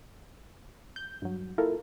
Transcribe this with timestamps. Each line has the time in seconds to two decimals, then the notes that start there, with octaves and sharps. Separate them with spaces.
0.96 G6
1.22 G2 F#3
1.58 A#3 E4 F4 A4 A#4